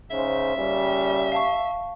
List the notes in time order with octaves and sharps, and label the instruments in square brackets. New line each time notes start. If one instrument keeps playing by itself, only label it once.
[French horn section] G#2 C#3 C5 [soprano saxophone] E5
[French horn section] A#2 C#3 G3
[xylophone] F5 A5 C#6